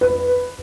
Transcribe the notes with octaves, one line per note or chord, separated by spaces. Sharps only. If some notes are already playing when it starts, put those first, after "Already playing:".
B4